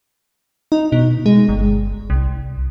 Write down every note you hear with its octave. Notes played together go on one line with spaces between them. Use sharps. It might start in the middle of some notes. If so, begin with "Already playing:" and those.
D#4
B2
G#3
G1
C2